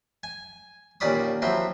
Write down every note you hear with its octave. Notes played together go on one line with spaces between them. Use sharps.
G#5
D#2 A#2 C#4 D5 B5 D#6
F3 F#3 C4 E4